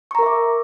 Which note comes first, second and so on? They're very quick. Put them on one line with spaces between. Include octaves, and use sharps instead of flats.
C#6 A#5 A#4 E5 D6